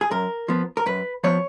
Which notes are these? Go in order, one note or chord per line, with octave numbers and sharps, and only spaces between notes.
G#4
F#2 A#4
F3 B3
A#4
F#2 B4
F3 B3 C#5